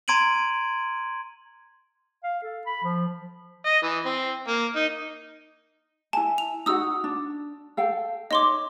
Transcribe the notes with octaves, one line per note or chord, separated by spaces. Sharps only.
A#5 C6 G#6 D7 D#7 F#7
F5
A4
B5
F3
D#5
E3
C4
A#3
D#4
E4 G#5 A5
F7
D#4 F#4 F#5 D#6 E6
D4
A4 F5 G5
D#4 C#5 D#5 C6 D6